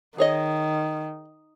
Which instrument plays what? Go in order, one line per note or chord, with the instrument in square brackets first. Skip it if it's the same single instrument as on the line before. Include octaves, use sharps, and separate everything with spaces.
[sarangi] D#3 [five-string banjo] G#4 C#5 D#5